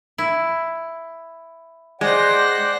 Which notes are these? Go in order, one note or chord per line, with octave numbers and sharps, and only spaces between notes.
E4
G#3 C5 D5 F#5 G5 F#6 A#6